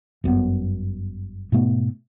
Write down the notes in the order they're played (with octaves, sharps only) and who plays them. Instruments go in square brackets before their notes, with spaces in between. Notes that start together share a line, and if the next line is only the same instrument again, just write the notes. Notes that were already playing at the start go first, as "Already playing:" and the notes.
[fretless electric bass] G1 F#2 D3 B3
G#2 B2 A3 B3